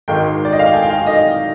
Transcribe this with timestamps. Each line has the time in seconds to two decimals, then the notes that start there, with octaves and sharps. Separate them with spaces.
0.08 G#1 G#2 D#3 G5
0.45 D5
0.53 D#5
0.59 F5
0.66 G5
0.74 G#5
0.83 G5
0.90 F5
1.07 D#5